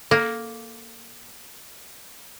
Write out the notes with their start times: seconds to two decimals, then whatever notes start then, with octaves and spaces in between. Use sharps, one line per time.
0.11 A#3 A4